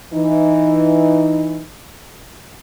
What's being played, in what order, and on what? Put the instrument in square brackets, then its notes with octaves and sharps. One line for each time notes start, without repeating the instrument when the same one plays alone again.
[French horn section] E3 D#4